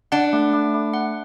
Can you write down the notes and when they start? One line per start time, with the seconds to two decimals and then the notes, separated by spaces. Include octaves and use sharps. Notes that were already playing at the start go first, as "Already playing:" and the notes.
0.12 D4 F#5
0.33 A3
0.53 A3
0.74 A3
0.94 F#5